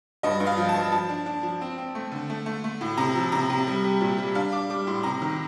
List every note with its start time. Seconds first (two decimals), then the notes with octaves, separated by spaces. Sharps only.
0.23 G2 D#5
0.40 G2
0.47 F5
0.57 F3
0.69 A5
0.75 G2
0.92 F3 A5
1.09 D4
1.26 D4
1.43 F3
1.61 C4
1.78 C4
1.95 A3
2.12 D3
2.30 A3
2.46 A3
2.64 A3
2.81 A2
2.97 C3 A#5
3.15 F3
3.32 C3 A#5
3.50 C3
3.67 G3
3.84 G3
4.01 A#2
4.18 G3
4.35 D4 F5
4.52 D4 D6
4.70 G3 D6
4.87 A2 C6
5.03 C3 A#5
5.22 D#3